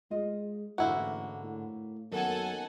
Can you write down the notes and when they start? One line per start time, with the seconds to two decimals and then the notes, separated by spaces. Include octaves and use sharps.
0.11 G#3 F4 D#5
0.78 A1 G#2 D3 A#3 E4 F#4 C5
1.44 A2
2.12 F#2 D#3 A#3 B3 A4 F#5 G#5